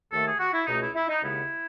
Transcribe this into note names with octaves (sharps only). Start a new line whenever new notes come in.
D#2 D#3 A3 A4
G#4
F#4
E4
C#2 B2 A3 D#4
E4
E4
D#4
D#2 C#3 G#3 B3 E4